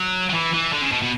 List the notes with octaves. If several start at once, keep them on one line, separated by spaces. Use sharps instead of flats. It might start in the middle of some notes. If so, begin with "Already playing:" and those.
Already playing: F#3
F#3
E3
E3
D3
C#3
B2
B2